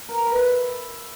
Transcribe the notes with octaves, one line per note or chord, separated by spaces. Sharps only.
A#4
A#5
B4
E5